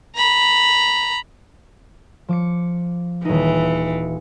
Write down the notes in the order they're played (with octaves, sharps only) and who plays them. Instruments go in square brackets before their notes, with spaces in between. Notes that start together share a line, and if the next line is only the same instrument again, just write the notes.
[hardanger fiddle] A#5 B5
[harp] F3 D6 C#7
[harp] D#1 D#4 [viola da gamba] E3
[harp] C#7